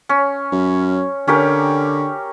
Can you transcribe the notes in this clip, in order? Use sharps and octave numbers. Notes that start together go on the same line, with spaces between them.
C#4
F#2
D3 C#4 G4 A#4